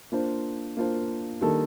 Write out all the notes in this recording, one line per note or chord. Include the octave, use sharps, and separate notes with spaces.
A#3 D4 F4 C5
A#3 D4 F4 C5
D#3 G3 A#3 D4 A4